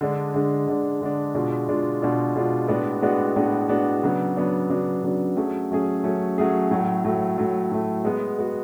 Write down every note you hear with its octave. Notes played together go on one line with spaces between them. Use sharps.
D3 G#3 D4
D3 G#3 D4
D3 G#3 D4
D3 G#3 D4
B2 G#3 D4 F4
B2 G#3 D4 F4
B2 G#3 D4 F4
B2 G#3 D4 F4
A2 G#3 B3 D4 F#4
A2 G#3 B3 D4 F#4
A2 G#3 B3 D4 F#4
A2 G#3 B3 D4 F#4
C#3 F#3 B3 D4
C#3 F#3 B3 D4
C#3 F#3 B3 D4
C#3 F#3 B3 D4
F#3 A3 C#4 G#4
F#3 A3 C#4 G#4
F#3 A3 C#4 G#4
F#3 A3 C#4 G#4
A2 F#3 A3
A2 F#3 A3
A2 F#3 A3
A2 F#3 A3
G#3 B3 F#4
G#3 B3 F#4